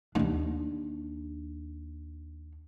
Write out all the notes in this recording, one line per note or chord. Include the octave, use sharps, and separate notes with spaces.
D#2 D4